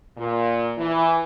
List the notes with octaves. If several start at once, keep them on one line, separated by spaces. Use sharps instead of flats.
A#2
E3